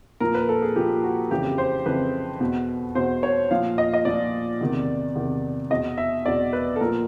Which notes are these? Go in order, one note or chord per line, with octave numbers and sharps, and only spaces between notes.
A#2 F3 A#4
B4
A4
G#4
A#2 F3 G4
F#4
F2 C#3 E3 G4
C5
F2 C#3 E3 B4
E2 B2
E2 B2 C5
C#5
A#2 F3 F5
D#5
D#5
A#2 F3 D5
E2 C3 D#3
E2 C3 D#3
E2 B2 D#5
E5
E2 B2 D5
B4
A4
A#2 F3 A#4